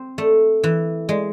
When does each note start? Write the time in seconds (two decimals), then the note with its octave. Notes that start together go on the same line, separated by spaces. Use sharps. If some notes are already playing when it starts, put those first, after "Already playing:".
Already playing: C4
0.18 A3
0.64 E3
1.09 G#3